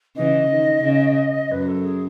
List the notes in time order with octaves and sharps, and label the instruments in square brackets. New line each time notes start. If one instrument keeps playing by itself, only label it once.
[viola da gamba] C#3 E3 [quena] D#5
[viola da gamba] D#3
C#3
[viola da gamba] F#2 [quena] B4
[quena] A4
G#4